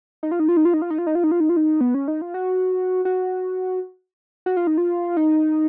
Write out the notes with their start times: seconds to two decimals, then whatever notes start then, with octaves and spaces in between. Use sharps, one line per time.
0.23 D#4
0.31 F4
0.40 D#4
0.48 F4
0.57 D#4
0.65 F4
0.74 D#4
0.82 F4
0.90 D#4
0.98 F4
1.07 D#4
1.15 F4
1.24 D#4
1.31 F4
1.40 D#4
1.49 F4
1.56 D#4
1.81 B3
1.94 C#4
2.08 D#4
2.21 F4
2.34 F#4
3.05 F#4
4.46 F#4
4.57 F4
4.67 D#4
4.78 F4
5.17 D#4